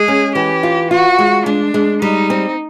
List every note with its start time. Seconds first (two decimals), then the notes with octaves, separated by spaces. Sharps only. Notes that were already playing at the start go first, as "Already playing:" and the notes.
Already playing: G#3 G#4
0.08 C#4
0.35 E3 G4
0.63 F4
0.91 F4 F#4
1.19 G#3
1.46 G#3 D4
1.74 G#3
2.02 G3 D#4
2.30 C4